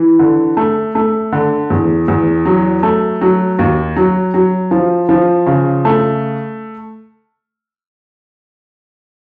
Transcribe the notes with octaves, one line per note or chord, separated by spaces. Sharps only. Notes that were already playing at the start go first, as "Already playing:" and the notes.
Already playing: E3
D3
A3
A3
D3
E2
E2
F#3
A3
F#3
D#2
F#3
F#3
F3
F3
C#3
A3